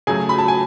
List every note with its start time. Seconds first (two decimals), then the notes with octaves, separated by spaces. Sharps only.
0.07 C#3 F#3 A3 G#4 G#5
0.29 B5
0.38 A5
0.48 G#5